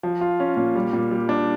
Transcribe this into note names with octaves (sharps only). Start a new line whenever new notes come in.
F3
F4
C#4
A#2
G3
A#2
G3
D4